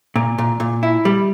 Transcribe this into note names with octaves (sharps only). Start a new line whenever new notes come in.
A#2
A#2
A#2
E4
G3